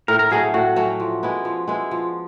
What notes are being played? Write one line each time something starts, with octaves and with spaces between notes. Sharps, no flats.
A2 A#4
A#4
F#3 A3 C#4 G#4
A2 F#4
F#3 A3 C#4
F3
G#3 B3 E4
F3
G#3 B3 E4
F3